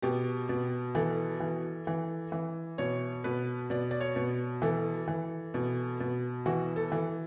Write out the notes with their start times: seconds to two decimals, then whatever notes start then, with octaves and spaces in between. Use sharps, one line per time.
0.02 B2 G4
0.49 B2
0.95 E3 A4
1.40 E3
1.87 E3
2.32 E3
2.78 B2 C#5
3.24 B2 B4
3.70 B2 D5
3.91 D5
4.01 C#5
4.16 B2
4.62 E3 A4
5.08 E3
5.54 B2
6.00 B2
6.46 E3 F#4
6.76 A4
6.92 E3